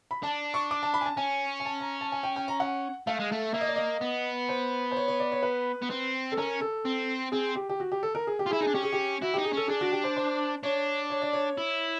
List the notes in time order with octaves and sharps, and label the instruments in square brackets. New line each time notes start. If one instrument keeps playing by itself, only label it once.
[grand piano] B5
[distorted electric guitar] D4 [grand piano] A5
[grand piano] C#6
D6
A5
B5
G#5
A5
[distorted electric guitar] C#4 [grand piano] G#5
[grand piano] G#5
A5
A#5
A5
G#5
G5
G5
A#5
F#5
[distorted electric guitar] A3 [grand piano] F5
[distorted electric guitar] G#3
A3
[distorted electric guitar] A#3 [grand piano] E5
[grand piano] D#5
D5
D#5
[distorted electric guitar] B3
[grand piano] C5
C5
C#5
C#5
D5
C#5
B4
[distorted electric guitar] B3
C4
[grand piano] A4
[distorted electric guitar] C#4 [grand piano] A#4
[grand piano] A4
[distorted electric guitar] C4
[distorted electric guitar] C4 [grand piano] G#4
[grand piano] G4
G4
F#4
G4
A4
A#4
G#4
G4
[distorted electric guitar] F4
[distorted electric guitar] E4 [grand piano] G#4
[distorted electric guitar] D#4 [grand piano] G#4
[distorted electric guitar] D4
[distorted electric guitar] C#4 [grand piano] G4
[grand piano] G#4
G4
[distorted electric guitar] E4 [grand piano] F#4
[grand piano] G4
[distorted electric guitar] D#4
[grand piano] G#4
[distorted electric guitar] C#4 [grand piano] A4
[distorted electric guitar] D4 [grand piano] G#4
[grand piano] F#4
G4
C5
C5
[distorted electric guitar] D4 [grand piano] C#5
[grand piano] C#5
D5
C#5
[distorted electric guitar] E4